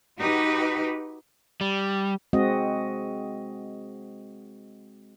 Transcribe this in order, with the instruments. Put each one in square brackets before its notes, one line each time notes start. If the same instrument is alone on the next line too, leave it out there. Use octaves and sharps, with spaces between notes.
[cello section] D#4 F#4 G4 B4
[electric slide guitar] G3
[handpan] G#3 C4 F#4 D#5